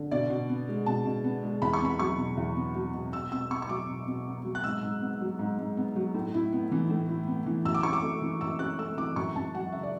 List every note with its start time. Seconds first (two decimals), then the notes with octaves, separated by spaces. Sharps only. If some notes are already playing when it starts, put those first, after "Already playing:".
Already playing: D3
0.11 B2 D5
0.30 B2
0.49 B3
0.68 G#3
0.86 B2 A5
1.05 B2
1.24 B3
1.43 G#3
1.62 E2 B5
1.73 C#6
1.81 B3 B5
1.99 F#3 C#6
2.18 B2
2.37 E2
2.56 B3
2.75 F#3
2.94 B2
3.13 B2 E6
3.32 B2 E6
3.51 B3 C#6
3.62 C#6
3.69 F#3 D6
3.88 B2
4.07 B2
4.27 B3
4.44 F#3
4.55 F#6
4.64 G#2 E6
4.83 G#2
5.01 B3
5.21 F#3
5.39 G#2
5.59 G#2
5.77 B3
5.96 F#3
6.15 A2
6.34 E4
6.52 B3
6.72 E3
6.90 A2
7.09 E4
7.27 B3
7.46 E3
7.65 F#2 E6
7.74 D6
7.83 C#4 C#6
7.93 D6
8.03 A3
8.22 E3
8.41 F#2 E6
8.59 C#4 F#6
8.78 A3 E6
8.98 E3 D6
9.16 F#2 C#6
9.35 F#2 A5
9.54 F#3 F#5
9.72 C#3 E5
9.83 D5